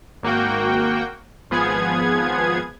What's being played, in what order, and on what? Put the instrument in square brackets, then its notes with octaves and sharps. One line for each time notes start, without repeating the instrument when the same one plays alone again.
[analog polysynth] G#1 A#3 F#4 G5
G#1 F3 B3 G#4 G#6